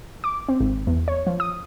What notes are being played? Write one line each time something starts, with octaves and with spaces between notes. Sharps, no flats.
D6
C4
G#1
E2
C#5
F3
D#6